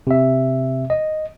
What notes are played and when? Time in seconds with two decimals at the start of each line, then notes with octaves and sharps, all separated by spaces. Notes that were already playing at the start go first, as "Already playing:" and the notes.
0.07 C3 E5
0.90 D#5